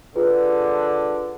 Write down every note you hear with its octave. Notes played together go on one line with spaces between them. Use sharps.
D3 F4 G#4 B4